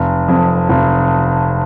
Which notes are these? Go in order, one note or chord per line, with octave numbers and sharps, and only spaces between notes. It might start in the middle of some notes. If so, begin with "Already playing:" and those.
Already playing: F1
F2
F1